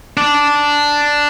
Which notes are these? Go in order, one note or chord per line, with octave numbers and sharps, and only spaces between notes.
D4